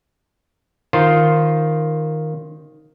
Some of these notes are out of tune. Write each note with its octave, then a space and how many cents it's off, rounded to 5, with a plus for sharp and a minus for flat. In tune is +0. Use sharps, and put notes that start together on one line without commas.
D#3 +0 F4 +0 C5 +0